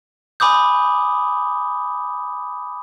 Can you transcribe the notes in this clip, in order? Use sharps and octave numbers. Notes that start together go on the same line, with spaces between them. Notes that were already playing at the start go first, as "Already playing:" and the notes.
G#5 B5 D6 D#6 G6